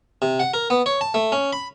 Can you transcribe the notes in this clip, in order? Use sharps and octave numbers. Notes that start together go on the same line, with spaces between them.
C3
F#5
A#4
B3
C#5
A5
A3
C#4
B5